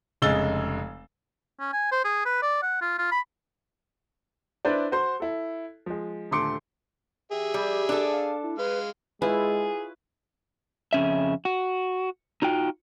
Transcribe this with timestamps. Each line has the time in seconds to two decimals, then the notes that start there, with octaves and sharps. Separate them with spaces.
0.22 F1 C#3 G#3 E6 A6 G7
1.60 C#4
1.73 G#5
1.92 C5
2.05 G#4
2.26 B4
2.43 D5
2.63 F#5
2.82 F4
2.99 F4
3.12 B5
4.65 D4 E4 B4 C5 D5
4.92 F#4 C5 C6
5.20 E4 A4
5.86 F3 G#3
6.31 D#1 D3 A3 C6 D6 C#7
7.32 G4 G#4 E5
7.54 G3
7.89 D4 A4
8.12 F5
8.43 E4
8.59 G#3 B4 F5
9.22 G#3 E4 F4 G#4 B4 C#5
10.93 F2 C#3 C#4 E5
11.45 F#4
12.42 D#4 F4 F#4 G5